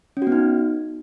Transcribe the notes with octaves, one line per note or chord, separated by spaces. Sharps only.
C#4
F#4
B3
D#4